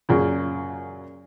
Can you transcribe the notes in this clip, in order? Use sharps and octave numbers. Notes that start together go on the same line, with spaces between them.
F#2 A#2 C#3